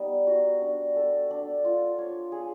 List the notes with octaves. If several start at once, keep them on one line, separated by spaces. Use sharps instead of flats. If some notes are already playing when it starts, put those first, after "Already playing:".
Already playing: G3 B3 D#4
F#4
D4
A4
D4
F4
C#5
G#4